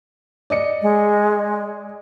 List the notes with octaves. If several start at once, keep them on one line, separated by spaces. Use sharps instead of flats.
D5 D#5 C#7
G#3